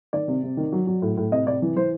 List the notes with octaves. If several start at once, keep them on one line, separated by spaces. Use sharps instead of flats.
D#3 D5
C3
C3
D#3
F#3
F#3
A2
A2
C3 D#5
C3 D5
E3
E3 C5